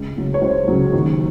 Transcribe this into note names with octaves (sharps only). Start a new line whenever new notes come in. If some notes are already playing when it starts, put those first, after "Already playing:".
Already playing: C#2
C#3 F#3
C#5
C#2 C5
C#3 F#3
D#2